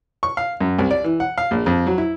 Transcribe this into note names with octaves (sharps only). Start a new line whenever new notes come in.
C#6
F5
F#2
C2
D5
E3
F#5
F5
A#1
F2
F#3
E4